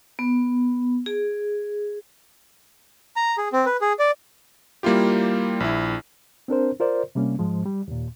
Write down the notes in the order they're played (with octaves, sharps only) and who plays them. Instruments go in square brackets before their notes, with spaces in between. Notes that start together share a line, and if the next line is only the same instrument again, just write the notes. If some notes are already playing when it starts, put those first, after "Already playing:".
[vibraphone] B3
G#4
[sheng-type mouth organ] A#5
G#4
C4
B4
G#4
D5
[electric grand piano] G3 A#3 E4 F4 G4
A#1 E4
[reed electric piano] C4 D4 A#4 C5
F4 A#4 C5 D5
C3 G3 A#3 C#4
G#2 F3 G#3
G3
D#2 A#2